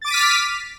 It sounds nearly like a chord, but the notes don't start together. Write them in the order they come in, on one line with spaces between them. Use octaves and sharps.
A6 D6 D#7 B6 F6